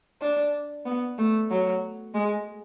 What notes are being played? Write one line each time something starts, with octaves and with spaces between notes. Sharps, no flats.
D4
B3
A3
F#3
G#3